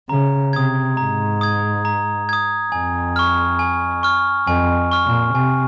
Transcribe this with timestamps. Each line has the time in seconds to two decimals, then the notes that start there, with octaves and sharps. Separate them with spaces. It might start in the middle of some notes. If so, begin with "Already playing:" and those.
0.09 C#3 A#5
0.53 C3 D#6 G#6
0.97 G#2 A#5
1.41 D#6 G#6
1.85 A#5
2.29 D#6 G#6
2.72 F2 G#5
3.16 C#6 F6
3.59 G#5
4.03 C#6 F6
4.47 F2 G#5
4.91 C#6 F6
5.06 A#2
5.35 C3 G#5